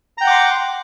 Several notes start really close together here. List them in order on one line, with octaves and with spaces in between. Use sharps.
A#5 G5 F#5 D6 C6